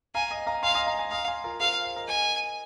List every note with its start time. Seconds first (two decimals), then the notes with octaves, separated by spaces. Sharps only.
0.15 F5 G#5 A#5
0.31 D#5 G#5
0.47 F5 A#5
0.63 F5 G#5 C6
0.75 D#5 G#5
0.87 F5 A#5
0.99 G#5 C6
1.11 F5 A#5 D#6
1.28 G#5 C6
1.44 F4 A#4
1.60 G#4 C5 F5
1.84 C5 F5
1.96 A#4 D#5
2.08 A#4 D#5 G#5